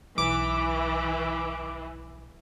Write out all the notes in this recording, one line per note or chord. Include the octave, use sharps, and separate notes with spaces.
B1 E3 D6